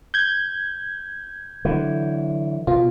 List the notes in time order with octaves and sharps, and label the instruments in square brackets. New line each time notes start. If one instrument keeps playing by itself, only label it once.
[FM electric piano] G6 G#6
[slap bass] D3 E3 F#3
[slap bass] B2 [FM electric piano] F4